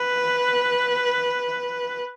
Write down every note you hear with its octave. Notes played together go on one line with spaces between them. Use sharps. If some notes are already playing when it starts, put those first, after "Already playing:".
Already playing: B4